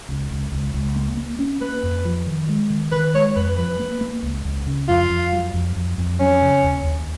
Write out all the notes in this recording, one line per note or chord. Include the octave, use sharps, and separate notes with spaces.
C#2
C#2
C#2
C#2
A#3
A#3
C#4
A#3 B4
F2
F3
D#3
G#3
D#3
D#3 B4
G#3 C#5
F2 B4
F3 B4
A#3
A#3
C#2
C#2
C#3
F2 F4
F2
F#3
F2
F2
F2
F#3 C#4
C#3
D#2
D#2